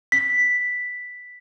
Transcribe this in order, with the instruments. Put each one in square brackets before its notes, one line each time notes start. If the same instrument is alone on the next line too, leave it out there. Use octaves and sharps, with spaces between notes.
[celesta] B6